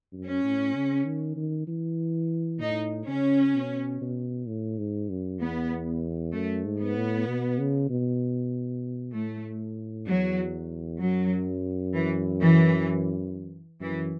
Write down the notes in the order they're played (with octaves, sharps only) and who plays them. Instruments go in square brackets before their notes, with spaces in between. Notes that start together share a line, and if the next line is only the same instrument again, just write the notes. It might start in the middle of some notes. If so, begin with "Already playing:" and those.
[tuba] F#2
[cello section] C#4
[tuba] A2
C#3
D#3
D#3
E3
[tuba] A2 [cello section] D#4
[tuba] C#3 [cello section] C#4
[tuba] B2
B2
A2
G#2
F#2
[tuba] E2 [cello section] B3
[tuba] F#2 [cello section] A3
[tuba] G#2
[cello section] B3
[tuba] A2
B2
C#3
B2
[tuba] A2 [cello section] A3
[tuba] E2 [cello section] F#3
[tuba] F#2 [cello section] F#3
[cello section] E3
E3
[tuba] F#2 [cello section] E3